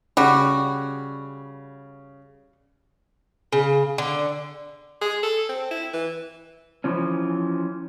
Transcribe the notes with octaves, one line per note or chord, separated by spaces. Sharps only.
C#3 G3 F#4
C#3
D3
G#4
A4
C4
E4
E3
E3 F3 C#4